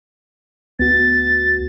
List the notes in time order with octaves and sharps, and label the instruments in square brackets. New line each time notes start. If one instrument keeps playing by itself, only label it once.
[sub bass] D2 [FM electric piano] B3 F#4 [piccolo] A6